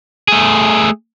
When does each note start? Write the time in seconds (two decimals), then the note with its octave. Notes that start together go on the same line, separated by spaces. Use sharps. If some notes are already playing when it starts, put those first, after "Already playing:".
0.28 A3 G#4